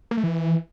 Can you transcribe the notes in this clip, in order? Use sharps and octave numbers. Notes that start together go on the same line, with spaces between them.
A#3
A3
E3